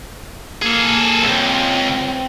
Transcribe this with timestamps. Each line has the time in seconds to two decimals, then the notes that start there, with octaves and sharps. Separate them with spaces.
0.62 A#3 G#4 A4
1.23 C#2 G2 C4